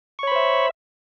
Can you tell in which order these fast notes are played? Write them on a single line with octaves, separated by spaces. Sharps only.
C#6 C#5 B5 C5 E5